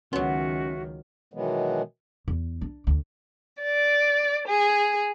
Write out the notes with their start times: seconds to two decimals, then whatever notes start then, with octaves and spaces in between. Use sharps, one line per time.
0.13 C#2 D#3 F#3 B3 C#4 F#4 E5 C6
1.34 B2 D#3 E3 F#3 G#3 B3
2.28 E2
2.61 D4
2.87 D2
3.61 D5
4.47 G#4